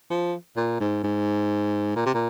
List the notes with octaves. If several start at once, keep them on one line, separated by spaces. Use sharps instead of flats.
F3
A#2
G#2
G#2
A#2
C3
A#2